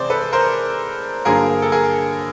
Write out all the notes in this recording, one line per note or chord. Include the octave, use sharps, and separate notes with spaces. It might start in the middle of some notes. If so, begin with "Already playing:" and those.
Already playing: C3 E3 G#3 C4 G#4 C5 D5
A4 B4
A#4 C5
G2 D3 F#3 A#3 G#4 A#4
A4
G#4 A#4